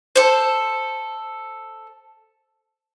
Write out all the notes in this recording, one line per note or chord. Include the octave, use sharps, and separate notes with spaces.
A4 C5